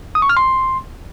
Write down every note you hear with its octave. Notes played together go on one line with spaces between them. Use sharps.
D#6
C#6
F6
C6